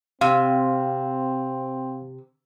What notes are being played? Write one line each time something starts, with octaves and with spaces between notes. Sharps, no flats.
C3 C4 F5